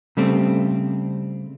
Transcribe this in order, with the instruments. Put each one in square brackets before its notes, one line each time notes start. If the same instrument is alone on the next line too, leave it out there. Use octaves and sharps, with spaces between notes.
[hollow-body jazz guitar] C#3 G3 A3 C4